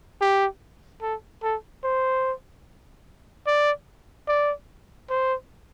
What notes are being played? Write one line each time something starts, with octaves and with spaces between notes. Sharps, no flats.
G4
A4
A4
C5
D5
D5
C5